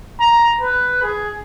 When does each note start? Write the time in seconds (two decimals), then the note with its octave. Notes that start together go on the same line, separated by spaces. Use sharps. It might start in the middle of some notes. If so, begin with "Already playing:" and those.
0.20 A#5
0.61 B4
1.03 G#4